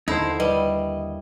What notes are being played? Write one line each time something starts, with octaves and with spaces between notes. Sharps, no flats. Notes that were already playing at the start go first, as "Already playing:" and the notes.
D#2 D3 D#4 E4 A4 C5
G3 B4 D#5